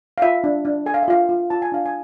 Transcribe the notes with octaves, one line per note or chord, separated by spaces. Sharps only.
F5
F4 E5
D4
D4
A4 G#5
F5
E5
F4 F5
F4
F4 A5
G#5
D4 F5
G#5